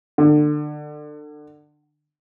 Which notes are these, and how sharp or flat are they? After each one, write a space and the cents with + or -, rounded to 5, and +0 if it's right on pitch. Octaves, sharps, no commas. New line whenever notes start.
D3 +30